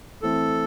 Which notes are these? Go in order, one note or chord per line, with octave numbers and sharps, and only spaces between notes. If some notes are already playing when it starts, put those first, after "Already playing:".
E3 A3 C4 A4